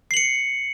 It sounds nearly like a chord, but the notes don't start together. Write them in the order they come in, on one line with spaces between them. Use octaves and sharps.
C7 F#7 C#7